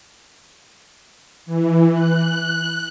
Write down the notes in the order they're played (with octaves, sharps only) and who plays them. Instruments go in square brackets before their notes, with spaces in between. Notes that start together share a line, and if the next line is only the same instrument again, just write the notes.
[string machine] E3
F#6